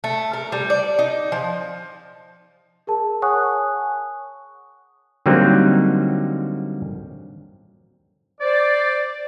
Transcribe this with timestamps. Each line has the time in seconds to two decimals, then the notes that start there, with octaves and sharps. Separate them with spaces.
0.04 A3
0.33 A#4
0.52 G3
0.70 D5
0.99 D#4
1.32 F3
2.87 G#4 A#4 A5
3.22 C#5 F#5 G#5 C#6 D#6 F#6
5.26 D3 F#3 G3 A#3 C4 D#4
8.41 C5 D5